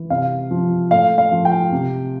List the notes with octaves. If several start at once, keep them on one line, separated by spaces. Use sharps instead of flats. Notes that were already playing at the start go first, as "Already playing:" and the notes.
Already playing: E3
C3 F5
F3
A2 F5
F5
F3
G5
C3